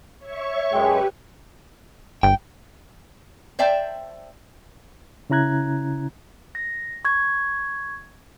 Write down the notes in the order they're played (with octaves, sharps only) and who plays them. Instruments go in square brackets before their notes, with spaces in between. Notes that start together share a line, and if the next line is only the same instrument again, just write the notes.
[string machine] C#5 E5 C#6
[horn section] F#2 G#3 [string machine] G4 B4 [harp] G5
[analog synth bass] G1 [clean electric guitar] G5
[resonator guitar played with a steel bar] C5 D5 E5 G5 A5
[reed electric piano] C#3 C#4 E4 A#5 F#6 G#6
[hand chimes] A#6
C#6 G#6